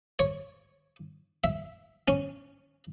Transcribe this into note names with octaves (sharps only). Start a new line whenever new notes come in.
C#5
E5
C#4